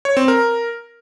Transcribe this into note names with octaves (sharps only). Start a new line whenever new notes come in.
C#5
C4
A#4